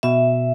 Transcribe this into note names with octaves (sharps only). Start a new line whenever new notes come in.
B2 E5